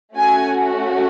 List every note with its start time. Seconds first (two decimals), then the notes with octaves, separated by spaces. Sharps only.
0.16 A3 C#4 F#4 G#5